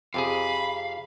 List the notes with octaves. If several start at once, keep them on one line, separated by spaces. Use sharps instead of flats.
F2 C3 G#4 F5 B5